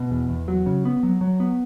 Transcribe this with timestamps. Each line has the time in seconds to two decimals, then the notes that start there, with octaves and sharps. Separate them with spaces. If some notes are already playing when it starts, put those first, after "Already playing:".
Already playing: B2
0.11 E2
0.29 E2
0.48 F#3
0.66 C#3
0.85 B3
1.03 F#3
1.21 F#3
1.40 B3